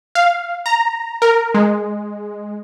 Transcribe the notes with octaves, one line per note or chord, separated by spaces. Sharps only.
F5
A#5
A#4
G#3